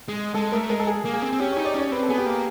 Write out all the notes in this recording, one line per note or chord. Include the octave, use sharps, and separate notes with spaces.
G#3
G#3 A4
A3 A#4
G#3 A#4
A4
G#4
A#3
G#4
C4
C4
C#4 G4
C#5
D#4
D5
C#4 C#5
C4 B4
A4
B3 G#4
G4
A#3